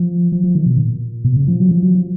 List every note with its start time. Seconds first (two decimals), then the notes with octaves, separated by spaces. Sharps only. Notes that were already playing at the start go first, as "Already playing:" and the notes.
Already playing: F3
0.32 F3
0.44 F3
0.55 D#3
0.66 B2
0.78 A#2
1.25 B2
1.36 C#3
1.48 F3
1.60 F#3
1.71 F3
1.83 F#3
1.94 F3